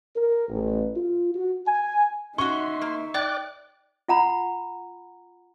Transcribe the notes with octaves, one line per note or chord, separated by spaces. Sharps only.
A#4
A1
F4
F#4
G#5
C#4 D#4 F#4 E5 C6 C#6
A#3
D5 G5 D6 F#6
F4 F#5 A#5 B5